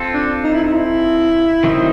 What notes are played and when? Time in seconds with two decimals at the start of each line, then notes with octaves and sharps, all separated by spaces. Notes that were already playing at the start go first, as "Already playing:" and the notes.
Already playing: C4 F4 A4
0.14 D4
0.44 D#4
0.54 E4
0.63 D#4
0.73 E4
1.64 D#3 F#3 A3 C4 D#4